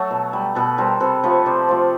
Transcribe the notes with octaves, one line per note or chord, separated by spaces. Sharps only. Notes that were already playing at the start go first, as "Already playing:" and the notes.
Already playing: F#3 A3 A4
B2
G3
B2 A4 B4
G3 A#4 C5
C3 A4 B4
F3 A3 B4 C#5
C3 C5 D5
F3 A3